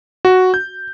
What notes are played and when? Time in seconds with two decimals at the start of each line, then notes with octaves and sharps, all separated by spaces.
0.25 F#4
0.54 G6